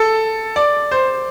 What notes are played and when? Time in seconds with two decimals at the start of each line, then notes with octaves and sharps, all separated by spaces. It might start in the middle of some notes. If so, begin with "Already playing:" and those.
Already playing: A4
0.56 D5
0.91 C5